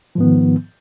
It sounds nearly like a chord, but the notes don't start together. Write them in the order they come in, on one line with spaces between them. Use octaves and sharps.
F3 G#2 B3 D#3